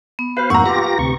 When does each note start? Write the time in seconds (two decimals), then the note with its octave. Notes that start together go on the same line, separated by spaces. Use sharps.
0.19 B3
0.37 B3 F#4 B4 C5 F5
0.50 F2 G#2 A#3 F#5 A#5 C#6 E6
0.66 F4 G4 B4 A#6
0.99 D2 C3 C#6